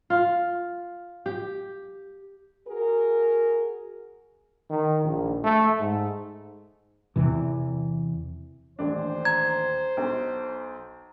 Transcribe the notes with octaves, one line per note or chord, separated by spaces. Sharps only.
F4
G4
F#4 G#4 A#4
D#3
A#1
A3
G#2
E2 C3 E3
D#1 A1 D4 C5
A#5 G#6
B1